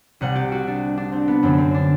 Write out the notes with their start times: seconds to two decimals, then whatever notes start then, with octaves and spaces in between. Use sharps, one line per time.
0.21 C2 C3 G3 F#5
0.35 G4
0.52 F#4
0.67 D4
0.98 D4
1.12 C4
1.28 B3
1.43 F#2 D3 F#3 A3 C4
1.58 C4
1.75 D4